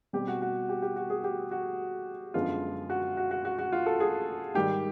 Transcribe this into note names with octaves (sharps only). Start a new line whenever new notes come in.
B2 G3 C4 G4
F#4
F#4
G4
G4
F#4
G#4
G4
F#4
F#2 D3 F3 G#3 B3 F4
F#4
F#4
F#4
F#4
F#4
F4
A4
G#4
G#2 D#3 G3 G4